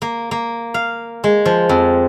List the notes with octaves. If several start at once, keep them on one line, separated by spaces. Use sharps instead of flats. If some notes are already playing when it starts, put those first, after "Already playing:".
A#3
A#3
F5
G#3
F3
F2